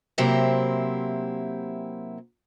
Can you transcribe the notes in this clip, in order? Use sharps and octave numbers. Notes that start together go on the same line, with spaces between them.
C3 F#3 A#3 C4 E4 G4